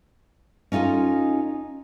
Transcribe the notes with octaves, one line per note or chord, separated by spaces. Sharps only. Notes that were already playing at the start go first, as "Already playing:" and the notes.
C#4 D#4 F4 A4 G#5